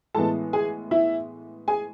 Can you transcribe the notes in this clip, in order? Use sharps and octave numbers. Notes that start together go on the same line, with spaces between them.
A2 E3 G#3 B3 A4 A5
G#4 G#5
E4 E5
G#4 G#5